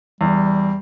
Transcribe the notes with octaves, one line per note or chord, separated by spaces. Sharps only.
E2 G3